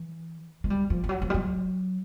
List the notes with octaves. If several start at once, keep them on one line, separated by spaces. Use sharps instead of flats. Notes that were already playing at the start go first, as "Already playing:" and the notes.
Already playing: E3
G#3
G3
F3
F3
F#3
F3
G3
F#3